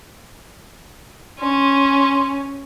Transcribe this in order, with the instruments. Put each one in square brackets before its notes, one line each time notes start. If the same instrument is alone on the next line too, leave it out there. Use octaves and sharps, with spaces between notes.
[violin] C#4 [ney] C6